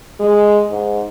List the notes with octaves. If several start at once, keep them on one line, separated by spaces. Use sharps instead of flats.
G#3
G#2